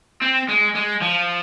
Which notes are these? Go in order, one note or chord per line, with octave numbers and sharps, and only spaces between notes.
C4
G#3
G#3
F3